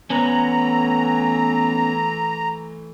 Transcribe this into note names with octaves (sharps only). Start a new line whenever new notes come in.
E3 A3 B3 C#4 A#5